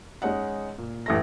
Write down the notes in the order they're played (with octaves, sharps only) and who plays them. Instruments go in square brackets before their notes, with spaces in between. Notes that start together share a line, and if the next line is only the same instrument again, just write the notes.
[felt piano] G#3 C#4 D#4 F#5
A#2
A1 A3 A#6